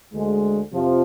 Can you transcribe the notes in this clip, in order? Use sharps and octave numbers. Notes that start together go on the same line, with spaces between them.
D2 D3 G#3
F2 C3 F3